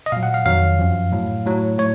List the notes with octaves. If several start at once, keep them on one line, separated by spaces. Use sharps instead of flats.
D#5
A#2 F#3 F5
F#5
F5
F2 D#3 F#3 F5
F#2 F3
A2 F#3
A2 F#3
A2 C#5